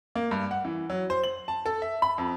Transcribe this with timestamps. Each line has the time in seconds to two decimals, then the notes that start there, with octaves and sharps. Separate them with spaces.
0.15 A#3
0.31 G2
0.51 F#5
0.65 E3
0.90 F#3
1.10 C5
1.24 F#7
1.48 A5
1.66 A4
1.82 E5
2.02 B5
2.18 F2